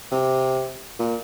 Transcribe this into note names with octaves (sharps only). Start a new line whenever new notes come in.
C3
A#2